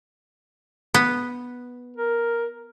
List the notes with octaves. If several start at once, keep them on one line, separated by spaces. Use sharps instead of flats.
B3
A#4